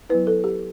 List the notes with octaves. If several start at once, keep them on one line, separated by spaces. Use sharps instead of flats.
F#3 B3 E4 B4
A4
G4